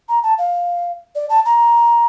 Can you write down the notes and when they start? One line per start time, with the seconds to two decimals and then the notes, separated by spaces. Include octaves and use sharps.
0.09 A#5
0.23 A5
0.38 F5
1.15 D5
1.29 A5
1.45 A#5